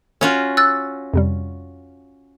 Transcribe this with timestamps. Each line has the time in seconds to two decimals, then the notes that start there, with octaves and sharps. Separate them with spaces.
0.21 C#4 F4 F#4
0.57 E6 F#6 A6
1.14 F2 C3 G3